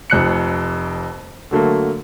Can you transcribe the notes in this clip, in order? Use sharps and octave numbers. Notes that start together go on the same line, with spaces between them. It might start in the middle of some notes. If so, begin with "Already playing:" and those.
F1 F2 F#6 C#7
D3 F#3 A3 A#3